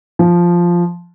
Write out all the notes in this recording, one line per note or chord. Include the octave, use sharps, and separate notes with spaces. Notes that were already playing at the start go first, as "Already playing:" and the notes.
F3